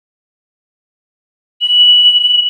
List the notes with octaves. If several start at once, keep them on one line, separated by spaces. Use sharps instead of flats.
F#7